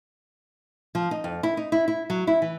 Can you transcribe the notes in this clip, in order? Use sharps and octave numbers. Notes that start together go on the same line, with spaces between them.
F3
D#4
F2
E4
D#4
E4
E4
F#3
E4
E3